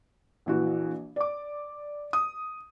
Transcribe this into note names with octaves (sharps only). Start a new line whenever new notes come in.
A#1 E3 F#4
D5 D6
D#6